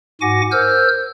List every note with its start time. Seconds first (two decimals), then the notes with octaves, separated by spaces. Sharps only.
0.21 G#2 F#4 F#5 G#5 D6 A#6
0.52 A#4 C5 E6 F6 G6